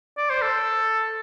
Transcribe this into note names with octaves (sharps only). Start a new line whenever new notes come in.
D5
C5
A4